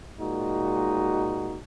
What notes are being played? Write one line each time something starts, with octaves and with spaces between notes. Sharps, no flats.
A#2 G#3 D#4 F#4